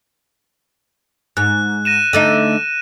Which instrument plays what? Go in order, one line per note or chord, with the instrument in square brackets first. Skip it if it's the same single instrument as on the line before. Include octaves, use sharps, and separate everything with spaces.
[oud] G#2 [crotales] F#6
[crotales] A#6 D#7 E7
[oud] D3 A3 D#4 [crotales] D#7